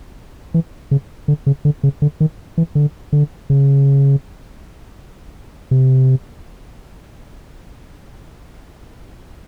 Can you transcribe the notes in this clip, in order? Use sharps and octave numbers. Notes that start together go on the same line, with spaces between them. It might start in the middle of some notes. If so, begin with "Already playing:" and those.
E3
C#3
D3
C#3
D3
C#3
D3
D#3
E3
D3
D3
C#3
C3